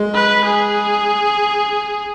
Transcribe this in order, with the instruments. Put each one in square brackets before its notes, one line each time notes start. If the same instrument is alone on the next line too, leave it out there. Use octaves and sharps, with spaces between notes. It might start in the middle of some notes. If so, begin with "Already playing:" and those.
Already playing: [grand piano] G#3
[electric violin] B4
G#4